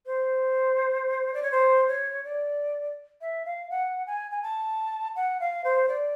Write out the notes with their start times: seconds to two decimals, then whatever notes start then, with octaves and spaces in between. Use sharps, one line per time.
0.06 C5
1.34 D5
1.42 C#5
1.51 C5
1.88 C#5
2.24 D5
3.21 E5
3.45 F5
3.70 F#5
4.06 G#5
4.31 G#5
4.42 A5
5.15 F#5
5.40 F5
5.64 C5
5.88 D5